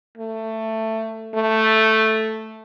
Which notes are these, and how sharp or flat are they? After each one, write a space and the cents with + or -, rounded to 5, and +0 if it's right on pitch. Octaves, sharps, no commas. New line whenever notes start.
A3 +15
A3 +0